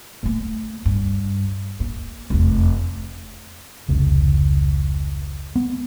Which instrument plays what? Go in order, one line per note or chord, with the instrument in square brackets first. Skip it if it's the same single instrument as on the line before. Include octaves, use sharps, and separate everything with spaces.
[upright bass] A3 A#3
G2
A#3
F1 E2
[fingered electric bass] F1 C#2
B3